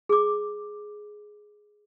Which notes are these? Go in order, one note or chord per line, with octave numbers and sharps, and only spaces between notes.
G#4 D6